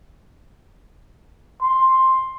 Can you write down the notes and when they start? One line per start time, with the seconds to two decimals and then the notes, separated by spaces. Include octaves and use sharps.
1.61 C6